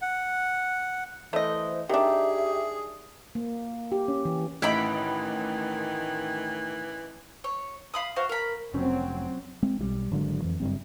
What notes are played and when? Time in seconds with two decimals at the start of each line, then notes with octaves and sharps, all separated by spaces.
0.02 F#5
1.33 E3 A3 C5 D#5
1.89 D#3 D4 G4 G#4 E5
3.35 A#3
3.92 G4
4.08 C#4
4.25 E3
4.62 A1 D#3 E3 E4 D#5 G5 B5
7.44 C#5
7.94 F5 B5 D#6
8.16 F#4 C5 F5
8.29 A#4 B5
8.74 F1 F#3 C4 C#4
9.63 G#3 C4
9.79 B1 F#3 G3
10.11 G#1 D3 F#3 G#3
10.42 F2 E3
10.60 F#1 G2 C4